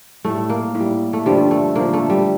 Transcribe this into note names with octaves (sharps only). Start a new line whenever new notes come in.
A2 G3 A3
A#3
A2
G3
A3
G2 D3 F3 G3
A3
G2 D3 F3 A#3
A3
G3